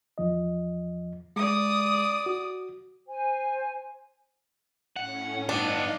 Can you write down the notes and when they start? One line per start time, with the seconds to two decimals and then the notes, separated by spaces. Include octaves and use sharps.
0.18 E2 F3 D#5
1.36 G#3 D5 D#6
2.26 F#4
3.08 C5 G#5
4.96 A2 C#4 F#5
5.49 G2 B3 D4 D#4 D#5 F5